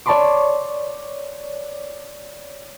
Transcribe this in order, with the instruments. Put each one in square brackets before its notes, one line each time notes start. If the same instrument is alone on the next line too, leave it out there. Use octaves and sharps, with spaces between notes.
[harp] C#5 D5 A5 B5 C6 D6